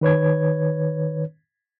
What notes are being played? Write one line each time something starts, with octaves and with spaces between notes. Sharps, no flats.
D#3 B4 C#5 G#6